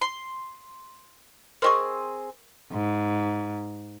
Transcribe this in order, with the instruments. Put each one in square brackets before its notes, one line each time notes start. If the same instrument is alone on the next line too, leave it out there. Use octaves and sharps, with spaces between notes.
[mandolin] C6
[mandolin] C4 G4 G#4 [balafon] A#4 D#5 C#6
[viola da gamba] G#2